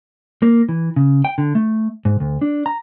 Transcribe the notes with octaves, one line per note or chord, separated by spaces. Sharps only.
A#3
E3
C#3
G5
D3
A3
G#2
D2
D4
A#5